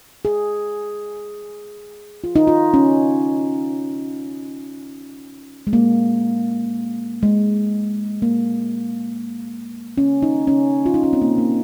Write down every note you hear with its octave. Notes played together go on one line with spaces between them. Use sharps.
G#4
F4
D#4
F4
C#4
G#3
A#3
G#3
A#3
C#4
D#4
C#4
F4
D#4
C#4
C4
A#3
A#3